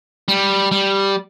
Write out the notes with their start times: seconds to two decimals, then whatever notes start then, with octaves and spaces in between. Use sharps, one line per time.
0.28 G3
0.72 G3